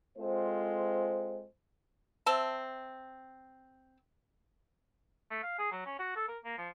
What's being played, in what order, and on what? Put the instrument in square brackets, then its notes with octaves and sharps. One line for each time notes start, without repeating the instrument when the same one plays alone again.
[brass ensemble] G#3 C4 F4 A4 C5
[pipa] C4 E5 A5
[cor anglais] A3
F5
G#4
F#3
C#4
F#4
A4
A#4
A#3
F3